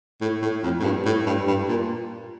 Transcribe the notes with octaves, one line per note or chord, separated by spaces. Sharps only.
A2
A2
F2
A2
G2
A2
G2
G2
A#2